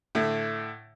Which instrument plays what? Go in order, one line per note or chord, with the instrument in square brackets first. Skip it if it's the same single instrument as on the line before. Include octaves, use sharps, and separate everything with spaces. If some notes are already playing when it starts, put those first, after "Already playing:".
[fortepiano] A2 D3 A3